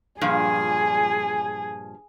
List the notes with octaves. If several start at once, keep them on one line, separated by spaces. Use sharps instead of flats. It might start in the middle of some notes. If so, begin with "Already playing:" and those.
G2 A#2 F3 G#4 G#5